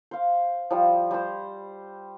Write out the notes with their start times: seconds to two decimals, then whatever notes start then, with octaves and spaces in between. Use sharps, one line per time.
0.11 C5 F5
0.71 F3 G3
1.11 G3 C5